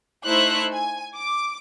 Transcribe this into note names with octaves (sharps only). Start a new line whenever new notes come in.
A3 D#4 E4 C5 E5 F#6
G#5
D6